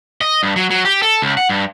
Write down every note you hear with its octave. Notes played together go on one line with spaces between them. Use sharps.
D#5
G2
F#3
F#3
G4
A4
C#2
F#5
G2